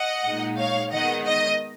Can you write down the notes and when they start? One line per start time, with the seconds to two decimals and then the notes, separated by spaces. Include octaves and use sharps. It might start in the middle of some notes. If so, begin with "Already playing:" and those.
Already playing: D#5 F#5
0.26 A#2 G#3 D#4
0.59 C#5 F5
0.92 D#3 G#3 B3 D#4 D#5 F#5
1.25 D#5